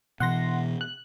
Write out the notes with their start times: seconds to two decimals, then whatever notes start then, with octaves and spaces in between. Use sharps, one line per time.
0.20 B2 E3 F#5 C6 A#6
0.81 F#6